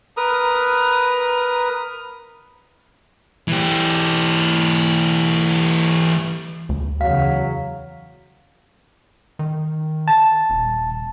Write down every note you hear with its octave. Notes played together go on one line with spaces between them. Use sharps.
A#4 B4 A#5 D#6
E3 G4
D2
E2 C#3 F#3 F5
D#3
A5
D#1